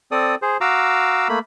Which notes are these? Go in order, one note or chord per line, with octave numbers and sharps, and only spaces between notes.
C4 A4 D5 D#6
G#4 C5
F#4 F5 A#5 D6 E6
A3 A#3 B5